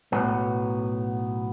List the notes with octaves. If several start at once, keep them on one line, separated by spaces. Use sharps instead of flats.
B1 A2 F#3 B3